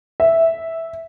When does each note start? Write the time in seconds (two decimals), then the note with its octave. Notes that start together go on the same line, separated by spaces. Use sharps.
0.20 E5